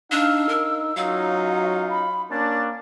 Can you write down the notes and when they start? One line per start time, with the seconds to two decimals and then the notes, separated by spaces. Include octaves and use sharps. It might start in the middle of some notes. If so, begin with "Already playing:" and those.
0.12 D4 D#4 F5 E6
0.49 A#4
0.97 F#3 C#4 D#4 F4 F5
1.90 B5
2.31 A#3 C#4 D4 A6